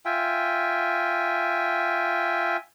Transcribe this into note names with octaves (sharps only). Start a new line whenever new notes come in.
F4 E5 G5 G#5